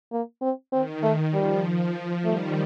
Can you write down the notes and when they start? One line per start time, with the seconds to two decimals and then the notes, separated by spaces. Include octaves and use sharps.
0.12 A#3
0.42 C4
0.72 D#3 C4
1.03 A3
1.33 F3 G3
1.63 F3
2.24 D#3 G3 A3